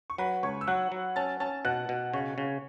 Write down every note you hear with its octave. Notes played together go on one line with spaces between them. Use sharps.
C#6
F#3 B4 B5
C#2 C#5 C#6
E6
F#3 F#5 F#6
F#3
C#4 A5 A6
C#4 A5 A6
B2 F#5 F#6
B2
C#3 C#5 C#6
C#3